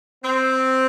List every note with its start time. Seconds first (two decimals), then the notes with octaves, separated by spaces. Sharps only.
0.23 C4